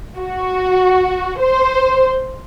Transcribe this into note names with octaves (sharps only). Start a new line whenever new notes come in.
F#4
C5